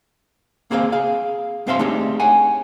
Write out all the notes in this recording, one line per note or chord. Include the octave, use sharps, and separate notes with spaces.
A#3 C4 G#4 C5 F5
G#4 F5
F#2 C4 C5 E5 F5 C6
A3 C4 D4 D#4 G4 G#4
C#5 F#5 G#5